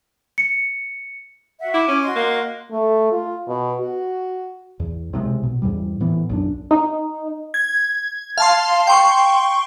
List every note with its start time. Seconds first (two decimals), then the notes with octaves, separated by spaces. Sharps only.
0.38 C#7
1.61 F#4 E5 F#5
1.74 E4 D6
1.88 C#4
2.03 F#4 D#5 C6
2.15 A#3
2.72 A3
3.12 F4
3.48 B2
3.80 F#4
4.80 E2
5.13 B1 C3 G3 G#3
5.43 B2
5.62 E2 G#2 G3
6.00 A2 E3 B3
6.29 B1 F#2 D4
6.71 D#4
7.54 G#6
8.38 F5 A5 C6
8.87 G5 C6 C#6